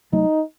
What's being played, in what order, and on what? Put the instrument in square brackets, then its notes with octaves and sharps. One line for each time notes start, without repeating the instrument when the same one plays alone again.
[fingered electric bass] C2 C3 F#3 A3 [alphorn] D#4